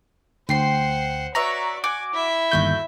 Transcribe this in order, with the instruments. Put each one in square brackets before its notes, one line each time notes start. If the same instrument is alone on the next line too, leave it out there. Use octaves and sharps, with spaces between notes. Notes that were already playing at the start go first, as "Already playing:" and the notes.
[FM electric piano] D2 C7 [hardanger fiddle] C5 F#5 [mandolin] G5 C6
[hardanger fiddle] F#4 D5 [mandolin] B4 C#5 E5 [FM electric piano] A#5
[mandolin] F#4 [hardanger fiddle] G#5 [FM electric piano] D6
[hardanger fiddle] E4 E5
[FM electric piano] G1 D#2 G6 [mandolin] A3 F#4 E6